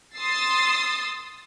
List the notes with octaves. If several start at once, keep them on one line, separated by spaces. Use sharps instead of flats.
C6 D#6 E6 A6 C7